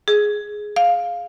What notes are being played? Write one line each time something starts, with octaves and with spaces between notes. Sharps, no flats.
G#4
F5